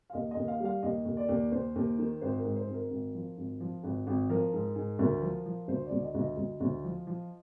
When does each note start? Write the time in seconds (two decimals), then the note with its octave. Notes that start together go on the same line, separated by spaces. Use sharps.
0.10 F5
0.13 D#2 D#5
0.31 D#5
0.37 D#2
0.48 F5
0.60 G3 F5
0.83 D#2 D#5
1.05 D#2
1.17 D5
1.29 D#2
1.52 D#2 C5
1.76 D#2
1.99 D#3
2.21 G#1 C5
2.38 A#4
2.45 G#2
2.56 C5
2.68 G#1
2.74 A#4
2.90 G#1
3.15 F3
3.37 G#1
3.60 F3
3.84 G#1
4.07 G#1
4.29 F3 A#4
4.53 G#2
4.76 G#2
4.99 D2 A#4
5.22 F3
5.46 F3
5.68 D2 C5
5.86 D5
5.91 D2
6.02 D#5
6.15 D2
6.20 D#5
6.37 D2
6.61 D2
6.84 F3
7.07 F3